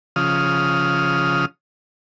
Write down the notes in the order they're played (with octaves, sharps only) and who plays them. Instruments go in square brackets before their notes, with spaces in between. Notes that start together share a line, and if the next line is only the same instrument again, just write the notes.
[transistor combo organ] C#3 F3 D#6 F6